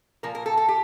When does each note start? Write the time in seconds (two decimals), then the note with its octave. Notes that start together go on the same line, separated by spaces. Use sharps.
0.23 A#2 F3 A#3 A#4
0.35 A#4
0.46 A4
0.57 A4
0.68 G4